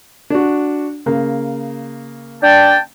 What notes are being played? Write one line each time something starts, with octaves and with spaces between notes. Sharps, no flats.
D4 F#4
C#3 A#3
D4 G5 A5